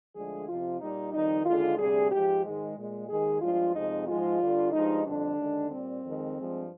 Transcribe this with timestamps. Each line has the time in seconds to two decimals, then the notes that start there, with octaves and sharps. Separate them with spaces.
0.15 D2 D3 F3 G#3 G#4
0.47 F2 C3 F3 F4
0.81 A#2 G3 D#4
1.13 F2 D#3 G3 D#4
1.45 D#2 D3 G#3 F4
1.78 D2 C3 G3 G#4
2.11 G#2 F3 G#3 G4
2.44 G#2 D#3 G#3
2.77 A#2 G#3
3.09 D#2 D#3 G#3 G#4
3.41 G2 F3 G#3 F4
3.74 F2 C3 F3 G#3 D#4
4.07 G#2 F3 G#3 F4
4.41 G2 D3 G3
4.72 G2 F3 G#3 D#4
5.05 F2 D3 G3 D4
5.38 D#2 D3 G#3
5.70 A#2 G3 C4
6.03 F2 D#3 G#3
6.37 G2 F3 G#3